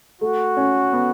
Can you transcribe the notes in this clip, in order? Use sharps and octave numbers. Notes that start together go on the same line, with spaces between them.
A3 F#4
C#4
B3